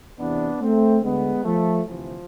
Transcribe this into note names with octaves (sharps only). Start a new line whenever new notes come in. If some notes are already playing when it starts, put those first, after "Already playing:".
E2 C3 E3 B3 D4
A3 C4
D2 D3 G#3 B3
F3 A3
D2 C3 E3 F3